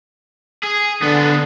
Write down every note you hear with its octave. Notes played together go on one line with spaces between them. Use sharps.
G#4
D3 B3 D4